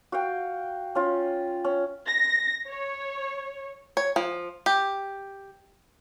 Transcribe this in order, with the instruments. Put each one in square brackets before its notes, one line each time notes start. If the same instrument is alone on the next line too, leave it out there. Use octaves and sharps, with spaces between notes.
[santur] F#4 F5 G5
C#4 F4
C#4
[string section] A#6
C#5
[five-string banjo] C#5
F3
G4